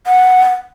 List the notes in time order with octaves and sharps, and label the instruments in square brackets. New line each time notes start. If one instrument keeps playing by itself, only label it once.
[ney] F#5